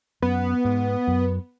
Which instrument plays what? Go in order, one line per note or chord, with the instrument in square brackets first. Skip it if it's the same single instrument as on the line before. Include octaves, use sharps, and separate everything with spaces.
[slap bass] F#2 [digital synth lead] B3
[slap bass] G#2
F#2